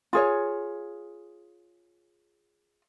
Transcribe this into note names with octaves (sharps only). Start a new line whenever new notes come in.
F4 G#4 C#5